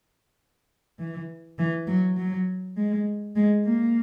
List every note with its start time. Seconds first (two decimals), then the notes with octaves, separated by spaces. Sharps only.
0.99 E3
1.58 E3
1.87 F#3
2.17 F#3
2.77 G#3
3.36 G#3
3.65 A#3